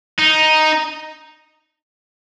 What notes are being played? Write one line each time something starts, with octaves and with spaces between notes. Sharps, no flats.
D#4